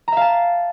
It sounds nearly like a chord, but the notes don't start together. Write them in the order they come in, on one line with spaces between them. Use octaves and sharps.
A#5 E5 F5 A5